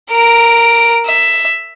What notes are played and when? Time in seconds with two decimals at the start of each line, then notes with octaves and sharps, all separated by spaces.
0.11 A#4 D7
1.07 E5